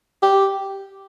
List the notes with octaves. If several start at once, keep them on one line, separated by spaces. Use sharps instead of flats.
G4